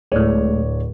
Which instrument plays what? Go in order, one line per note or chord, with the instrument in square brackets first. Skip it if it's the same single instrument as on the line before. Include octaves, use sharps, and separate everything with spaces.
[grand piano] D1 C#5 D5 [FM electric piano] A2 G#3